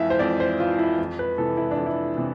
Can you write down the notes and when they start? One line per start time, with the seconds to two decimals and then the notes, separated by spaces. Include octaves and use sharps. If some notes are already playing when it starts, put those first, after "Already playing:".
Already playing: F2 E3 E5 F5
0.10 C5
0.19 F2 D5
0.40 C5
0.59 E3 F4
0.78 E4
0.98 F2
1.19 B4
1.38 C3 E3 A4
1.57 E4
1.71 D4
1.77 F2
1.86 E4
2.17 C3 E3